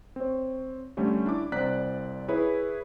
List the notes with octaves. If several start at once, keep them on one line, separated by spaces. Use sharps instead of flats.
C4 C#5
D3 G3 A3 C#4
D4 E4 D6
C2 C4 D5 A#5 F#6 B6
E4 G#4 B4 C#5